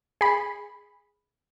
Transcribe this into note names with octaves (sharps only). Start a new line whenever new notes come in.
G#4 B5